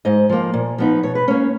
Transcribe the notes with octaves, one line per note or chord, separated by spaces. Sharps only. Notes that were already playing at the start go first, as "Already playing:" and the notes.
G#2 D#5
F3 A#3
A#2
F3 B3 D#4
B2 C#5
B4
A#3 C#4 C#5